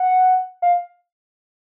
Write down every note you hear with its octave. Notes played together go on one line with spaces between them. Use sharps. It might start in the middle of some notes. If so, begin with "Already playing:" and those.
Already playing: F#5
F5